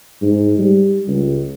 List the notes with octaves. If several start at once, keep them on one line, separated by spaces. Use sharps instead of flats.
G#2
G3
C#2